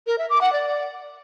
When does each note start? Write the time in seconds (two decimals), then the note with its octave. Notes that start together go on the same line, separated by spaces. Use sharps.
0.07 A#4
0.18 E5
0.30 D6
0.41 F#5
0.53 D5